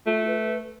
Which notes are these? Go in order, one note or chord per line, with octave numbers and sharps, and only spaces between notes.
A3 F4
B4